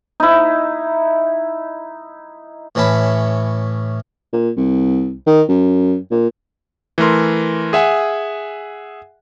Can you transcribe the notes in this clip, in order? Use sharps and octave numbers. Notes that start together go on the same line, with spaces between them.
D#4 E4
A2 E3 C#4 A5 B5
A#2
C2
D#3
F#2
A#2
E3 A3 A#4 C6
G#4 E5 F#5 G#5